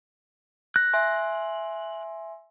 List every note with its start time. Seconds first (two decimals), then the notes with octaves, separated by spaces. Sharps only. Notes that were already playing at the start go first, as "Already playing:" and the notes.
0.76 F#6 A#6
0.93 E5 G#5 C6